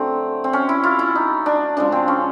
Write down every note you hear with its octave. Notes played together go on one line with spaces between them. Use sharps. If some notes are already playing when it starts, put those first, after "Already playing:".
Already playing: D3 F#3 A3 C4
C4
C#4
E4
F4
E4
D#4
D4
C#3 F3 G#3 D4
C4
C#4